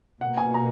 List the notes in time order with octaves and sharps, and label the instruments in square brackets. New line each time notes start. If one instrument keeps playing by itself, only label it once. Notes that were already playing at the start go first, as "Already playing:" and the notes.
[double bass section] B2 A#3 [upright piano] F#5
[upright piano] G#5
A#5